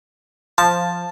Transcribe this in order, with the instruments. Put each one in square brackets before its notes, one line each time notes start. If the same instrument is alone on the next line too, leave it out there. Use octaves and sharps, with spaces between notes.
[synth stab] F3 [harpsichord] A5